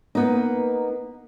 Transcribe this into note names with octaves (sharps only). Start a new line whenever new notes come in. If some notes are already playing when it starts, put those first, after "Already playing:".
A#3 B3 D#4